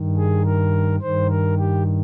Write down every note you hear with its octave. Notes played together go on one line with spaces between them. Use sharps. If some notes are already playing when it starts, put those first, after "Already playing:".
Already playing: G2 D#3
G#4
A#4
G2 D#3 C5
A#4
G4